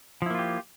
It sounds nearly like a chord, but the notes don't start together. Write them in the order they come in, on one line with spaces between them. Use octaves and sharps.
F3 E4 A#3 F4 G4